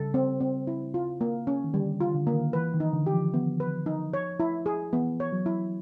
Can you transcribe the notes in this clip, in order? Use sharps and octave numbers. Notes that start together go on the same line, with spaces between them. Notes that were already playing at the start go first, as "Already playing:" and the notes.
Already playing: C#3 G3 A4
C4
C4
E4
F4
A#3
C#4
D#3
D3 G3
F4
D3
A#3
D#3
E3 B4
D#3
D#4
D3
G4
F3
B3
B4
D#4
C#5
E4
G#4
E3 B3
C#5
F#3
E4